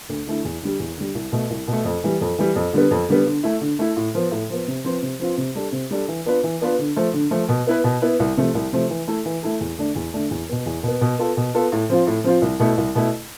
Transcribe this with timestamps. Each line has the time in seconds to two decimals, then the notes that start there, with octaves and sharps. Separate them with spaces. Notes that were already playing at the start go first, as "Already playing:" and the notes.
0.09 D2
0.26 D3 A3 E4
0.45 E2
0.62 D3 G3
0.79 E2
0.97 D3 G3
1.15 C2
1.32 B2 A3
1.50 C2
1.68 B2 A3
1.85 F2
2.03 E3 G3
2.21 F2
2.38 E3 G3
2.56 F2
2.73 D3 G3 B3
2.91 F2
3.09 D3 G3 B3
3.26 D3
3.43 A3 E4
3.61 D3
3.79 A3 E4
3.96 A2
4.15 F3 B3
4.31 A2
4.50 F3 B3
4.68 C3
4.84 F3 C4 F4 B4
5.02 C3
5.19 F3 C4 F4 B4
5.37 C3
5.55 G3 D4 A4
5.72 C3
5.91 G3 D4 A4
6.08 E3
6.26 B3 D4 F4 B4
6.43 E3
6.61 B3 D4 F4 B4
6.79 D3
6.96 F3 A3
7.13 D3
7.31 F3 A3
7.49 B2
7.67 B3 E4 B4
7.84 B2
8.02 B3 E4 B4
8.20 C2
8.37 C3 F3 A3
8.55 C2
8.72 C3 F3 A3
8.90 E3
9.08 A3 E4 A4
9.25 E3
9.43 A3 E4 A4
9.60 E2
9.78 D3 A3 D4
9.96 E2
10.14 D3 A3 D4
10.31 E2
10.49 B2 B3
10.66 E2
10.83 B2 B3
11.01 B2
11.19 B3 F4 A4
11.37 B2
11.54 B3 F4 A4
11.72 A2
11.90 F3 C4 F4
12.07 A2
12.24 F3 C4 F4
12.42 C2
12.59 B2 A3 E4
12.77 C2
12.95 B2 A3 E4